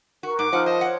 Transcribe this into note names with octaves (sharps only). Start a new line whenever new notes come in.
F#4 A#4 B4 F#5
G#2 D6
F3 D#4 D#5 F#5 D#6 F6
C5 D#5 A5
C5 C#5 F#5